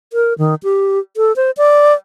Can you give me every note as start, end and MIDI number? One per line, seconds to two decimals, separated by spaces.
0.13 0.33 70
0.38 0.55 51
0.63 0.99 67
1.17 1.35 69
1.36 1.51 72
1.57 1.94 74